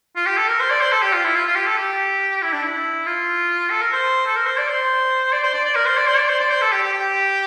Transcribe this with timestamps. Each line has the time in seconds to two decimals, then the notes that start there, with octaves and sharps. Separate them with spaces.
0.16 F4
0.27 G4
0.37 A4
0.48 A#4
0.60 C5
0.70 D5
0.81 C5
0.92 A4
1.02 G4
1.13 F4
1.24 E4
1.35 F4
1.47 F4
1.55 G4
1.67 A4
1.78 G4
2.42 E4
2.53 D4
2.64 E4
3.06 F4
3.70 A4
3.81 A#4
3.93 C5
4.26 A4
4.36 A#4
4.46 C5
4.58 D5
4.68 C5
5.32 D5
5.43 C5
5.53 D5
5.65 D5
5.75 A#4
5.86 C5
5.97 D5
6.07 C5
6.18 D5
6.29 C5
6.39 D5
6.51 C5
6.61 A4
6.72 G4
6.83 G4
6.93 G4